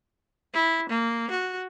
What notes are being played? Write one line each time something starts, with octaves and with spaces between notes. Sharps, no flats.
E4
A#3
F#4